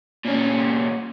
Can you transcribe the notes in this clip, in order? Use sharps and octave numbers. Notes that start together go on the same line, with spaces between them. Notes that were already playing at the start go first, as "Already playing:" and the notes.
A#2 C#4